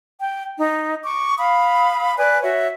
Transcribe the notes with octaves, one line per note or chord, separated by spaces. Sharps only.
G5
D#4
C#6 D6
F5 B5 D#6
B4 D5 G#5 F#6
F#4 C#5 E5